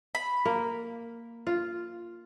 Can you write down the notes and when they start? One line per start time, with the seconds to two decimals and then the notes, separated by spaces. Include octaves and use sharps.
0.15 B5
0.45 A#3
1.47 F4